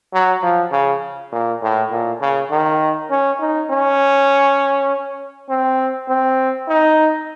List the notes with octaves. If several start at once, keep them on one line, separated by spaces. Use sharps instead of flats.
F#3
F3
C#3
A#2
A2
A#2
C#3
D#3
C#4
D#4
C#4
C4
C4
D#4